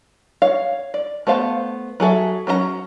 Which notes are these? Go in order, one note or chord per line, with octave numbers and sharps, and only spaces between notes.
C#5 F5
D5
A3 B3 C5 F5 A5
F#3 G#4 A4 E5
F#3 C#4 A4 A#5